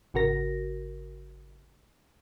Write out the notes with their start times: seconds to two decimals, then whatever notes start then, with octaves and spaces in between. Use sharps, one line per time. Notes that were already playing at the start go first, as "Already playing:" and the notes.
0.14 G#1 C#3 F#4 A#4 A#6